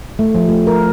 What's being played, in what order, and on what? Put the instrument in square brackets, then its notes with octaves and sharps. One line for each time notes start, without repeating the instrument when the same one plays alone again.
[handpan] A3
F3
A3
A#4